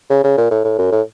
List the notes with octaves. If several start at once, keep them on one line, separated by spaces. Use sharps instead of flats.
C#3
C#3
A#2
A2
A2
F#2
A2